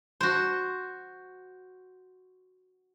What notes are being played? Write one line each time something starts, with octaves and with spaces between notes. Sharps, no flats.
F#4 C5